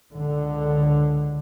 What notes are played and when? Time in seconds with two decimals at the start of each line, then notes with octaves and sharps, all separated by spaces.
0.14 C#2 D3